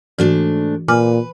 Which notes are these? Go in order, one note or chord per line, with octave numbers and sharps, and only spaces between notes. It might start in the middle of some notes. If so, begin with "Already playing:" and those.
G#2 E3 A3 D4 F#4
A#2 B4 G#5 D6 F6